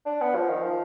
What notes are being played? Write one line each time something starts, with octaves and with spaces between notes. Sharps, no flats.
D4
B3
F3
D#3
F3